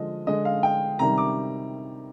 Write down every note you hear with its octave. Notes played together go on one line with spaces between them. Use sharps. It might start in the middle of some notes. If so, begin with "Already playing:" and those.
Already playing: D3 F3 G#3 D#5
D3 G#3 D#5
F5
G5
C3 D#3 G3 A#5
D6